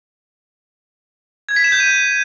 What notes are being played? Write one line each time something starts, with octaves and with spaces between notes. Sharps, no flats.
G#6
B6
E7
G6
D#7